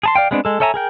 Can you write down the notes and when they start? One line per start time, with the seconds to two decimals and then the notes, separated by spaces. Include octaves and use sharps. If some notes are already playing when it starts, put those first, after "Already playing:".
0.03 G#4 A5 C6
0.16 D5 F5 G5
0.31 G#3 B3 C4 D4
0.45 G#3 A4
0.60 A4 C#5 E5 G#5 A#5
0.74 G#4 A#4 G5